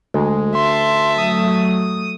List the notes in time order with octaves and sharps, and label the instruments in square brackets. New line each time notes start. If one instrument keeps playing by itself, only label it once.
[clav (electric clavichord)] D2 [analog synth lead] G#3
[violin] E5 A5 [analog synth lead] C6
[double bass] F#3 A3 [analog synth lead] D#6